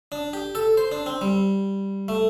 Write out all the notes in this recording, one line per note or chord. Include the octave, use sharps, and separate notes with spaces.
D4
G4
A4
C5
D4
C4
G3
A3